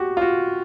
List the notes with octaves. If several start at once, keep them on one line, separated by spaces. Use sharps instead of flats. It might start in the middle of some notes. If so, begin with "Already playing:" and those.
Already playing: F#4 G4
F4
F#4